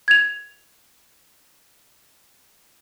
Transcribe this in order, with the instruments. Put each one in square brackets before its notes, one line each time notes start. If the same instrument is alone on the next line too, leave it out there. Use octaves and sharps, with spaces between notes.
[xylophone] G#6 F7